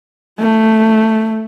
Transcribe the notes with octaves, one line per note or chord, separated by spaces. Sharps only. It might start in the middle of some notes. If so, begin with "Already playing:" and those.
A3